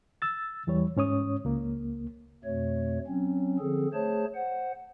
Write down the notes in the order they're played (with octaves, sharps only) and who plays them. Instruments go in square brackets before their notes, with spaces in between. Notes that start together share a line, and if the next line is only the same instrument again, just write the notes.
[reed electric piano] E6 A6
E2 E3 G3 C#5
G#2 C#4 C#5 D#6
C#2 A#3
[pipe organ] F2 B2 A3 C#5
F#3 C4 C#4
D3 F3 C4 G#4 A4
A3 G#4 C5 C#5 A5
C5 F#5